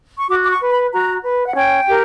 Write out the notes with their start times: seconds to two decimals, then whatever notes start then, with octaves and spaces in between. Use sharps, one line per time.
0.18 C#6
0.29 F#4 D6
0.45 D6
0.50 C#6
0.60 B4
0.71 B5
0.92 F#4 A#5
1.23 B4
1.48 F#5
1.55 C#4 G5
1.87 G4 A#4